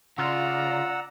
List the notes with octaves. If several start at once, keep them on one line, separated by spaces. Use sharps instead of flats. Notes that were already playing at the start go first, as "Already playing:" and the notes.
C#3 F4 D5 F#5 A#5 E6